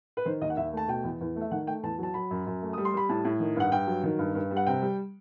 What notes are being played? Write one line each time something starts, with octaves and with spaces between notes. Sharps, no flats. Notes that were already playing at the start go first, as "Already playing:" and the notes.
B4
D#3 C5
D#2 D#5
F#5
D#2 E5
A3 A5
B2 G5
E2
E2
A3
E5
D#3 F#5
A3 G5
E2 A5
F#3 A5
F#3 B5
F#2
F#2
A3
G3 D#6
C6
G3 B5
A2 A5
A2
D#3
G2 F#5
G2 G5
F#3
D#3
G2
G2
G3
F#5
C3 G5
G3